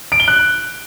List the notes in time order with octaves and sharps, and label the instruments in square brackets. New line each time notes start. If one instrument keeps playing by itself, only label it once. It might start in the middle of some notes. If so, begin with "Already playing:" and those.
[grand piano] D7
G7
F#6